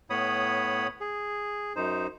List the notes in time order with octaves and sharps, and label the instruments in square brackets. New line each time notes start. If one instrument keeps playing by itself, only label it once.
[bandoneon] A2 B3 C#5 B5 D#6
G#4
F#2 D#4 C5